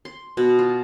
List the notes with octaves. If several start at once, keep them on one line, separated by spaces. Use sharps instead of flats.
C6
B2
F4